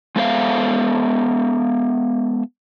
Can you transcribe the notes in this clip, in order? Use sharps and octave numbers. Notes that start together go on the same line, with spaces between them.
G#3 B3 A4 C5 E5 F5